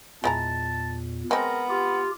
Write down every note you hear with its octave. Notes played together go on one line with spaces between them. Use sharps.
E2 A#2 G#3 E4 A5 A#5
G#3 B3 C4 A#4
F4 G4